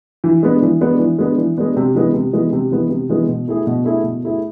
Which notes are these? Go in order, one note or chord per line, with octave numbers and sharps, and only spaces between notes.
E3
G#3 B3 D4
E3
G#3 B3 D4
E3
G#3 B3 D4
E3
G#3 B3 D4
C3
E3 G#3 B3
C3
E3 G#3 B3
C3
E3 G#3 B3
C3
E3 G#3 B3
B2
A3 E4 G#4
B2
A3 E4 G#4
B2
A3 E4 G#4